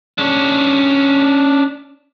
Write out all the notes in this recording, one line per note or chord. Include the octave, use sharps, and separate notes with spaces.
C#4 D4